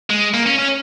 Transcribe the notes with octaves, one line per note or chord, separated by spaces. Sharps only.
G#3
A#3
C#4
C#4